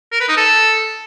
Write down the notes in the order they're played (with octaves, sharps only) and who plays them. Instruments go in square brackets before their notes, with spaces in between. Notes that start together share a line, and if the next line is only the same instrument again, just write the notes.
[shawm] A#4
B4
D#4
A4